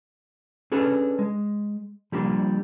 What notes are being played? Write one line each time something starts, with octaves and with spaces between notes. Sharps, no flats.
C#4 D4 G#4 A4 B4
G#3
F3 G3 A#3 D4